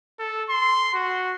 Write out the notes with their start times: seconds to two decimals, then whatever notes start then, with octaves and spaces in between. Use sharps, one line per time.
0.19 A4
0.49 C6
0.94 F#4